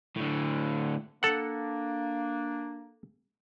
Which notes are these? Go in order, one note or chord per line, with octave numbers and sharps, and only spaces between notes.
A2 D3
A#3 D4 A4 F#5